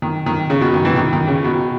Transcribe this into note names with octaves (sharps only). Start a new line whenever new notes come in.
D#3
D#3
C#3
B2
D#3
E3
D#3
D#3
C#3
B2